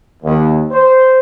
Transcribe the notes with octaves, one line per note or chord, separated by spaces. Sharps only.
D#2
C5